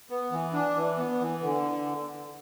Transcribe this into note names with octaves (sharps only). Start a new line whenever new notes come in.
B3
E3
D4
E3
B3
E3
D3